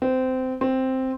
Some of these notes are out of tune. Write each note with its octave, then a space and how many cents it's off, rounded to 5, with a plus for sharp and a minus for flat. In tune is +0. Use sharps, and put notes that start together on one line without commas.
C4 -20
C4 +0